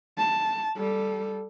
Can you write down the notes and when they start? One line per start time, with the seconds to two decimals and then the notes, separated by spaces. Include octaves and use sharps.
0.18 A5
0.77 G3 A4